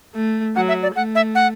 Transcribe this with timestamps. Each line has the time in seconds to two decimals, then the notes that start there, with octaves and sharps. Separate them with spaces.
0.15 A3
0.56 F#3 F#5
0.68 E5
0.83 D5
0.95 A3 F#5
1.15 E5
1.35 F#5